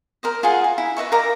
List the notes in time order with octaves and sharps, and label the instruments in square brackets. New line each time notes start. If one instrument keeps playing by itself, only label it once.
[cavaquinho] A#4 C5 D#5
F4 G#4 F#5 G#5
G#5
E4
B4 D#5 E5 C#6
A#4 F5 A#5 D6